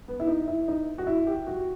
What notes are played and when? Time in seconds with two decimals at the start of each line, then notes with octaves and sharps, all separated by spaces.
0.08 B3
0.20 E4
0.27 D#4
0.48 E4
0.68 D#4
0.98 F#4
1.07 E4
1.27 G4
1.47 F#4